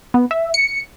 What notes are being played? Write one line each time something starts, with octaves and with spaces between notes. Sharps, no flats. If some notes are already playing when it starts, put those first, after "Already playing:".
B3
E5
C#7